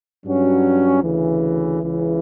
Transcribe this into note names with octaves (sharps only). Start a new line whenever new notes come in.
G2 F#3 C#4 F#4
D2 C#3 E3
C#2 C#3 E3